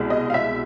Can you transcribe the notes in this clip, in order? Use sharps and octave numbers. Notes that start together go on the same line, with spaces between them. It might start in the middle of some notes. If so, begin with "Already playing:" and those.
Already playing: C2 B2 G#3
D#5
F5
E5